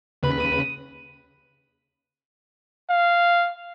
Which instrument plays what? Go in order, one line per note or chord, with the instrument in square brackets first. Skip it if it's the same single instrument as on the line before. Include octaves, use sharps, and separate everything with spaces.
[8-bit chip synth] D#2 B4 B5 [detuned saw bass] C#3
[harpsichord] D#6
[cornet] F5